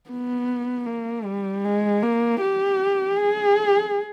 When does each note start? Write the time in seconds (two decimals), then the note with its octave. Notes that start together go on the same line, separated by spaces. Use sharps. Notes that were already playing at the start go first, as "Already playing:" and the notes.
0.10 B3
0.87 A#3
1.26 G3
1.65 G#3
2.03 A#3
2.41 G4
3.18 G#4